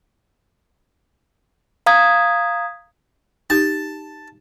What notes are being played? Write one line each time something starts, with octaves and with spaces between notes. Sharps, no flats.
F5 A#5 D#6 G#6
D#4 G4 A5